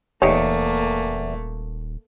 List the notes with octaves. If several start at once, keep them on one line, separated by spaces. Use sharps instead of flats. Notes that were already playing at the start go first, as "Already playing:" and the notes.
D#1 E2 A3 A#3 D#4 G4 C#5